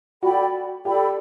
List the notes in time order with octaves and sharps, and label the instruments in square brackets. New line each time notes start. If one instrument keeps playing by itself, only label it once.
[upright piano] F#4 [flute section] A4 D5 G5 B5
[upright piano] G4 [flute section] A4 D5 G5 B5